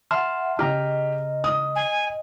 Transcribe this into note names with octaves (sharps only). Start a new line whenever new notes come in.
E5 F#5 A5 C6 F6
C#3 G4 D#5 A#5 F6
D#6
G#5